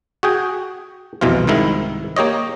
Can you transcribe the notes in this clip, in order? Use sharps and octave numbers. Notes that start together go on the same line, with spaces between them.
F#4 G#4 G5
C2 F2 B2 E3 F4
C2 G#2 D#3 E4
A#3 G4 C#5 D#5